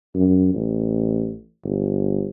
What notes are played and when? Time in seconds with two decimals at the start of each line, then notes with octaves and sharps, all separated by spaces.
0.15 F#2
0.54 A1
1.64 G1